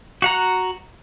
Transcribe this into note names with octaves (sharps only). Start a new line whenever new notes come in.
F#4 F#5 A#5